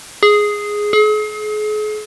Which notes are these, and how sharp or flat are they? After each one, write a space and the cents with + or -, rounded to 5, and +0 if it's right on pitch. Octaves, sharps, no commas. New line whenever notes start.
G#4 +0
G#4 +40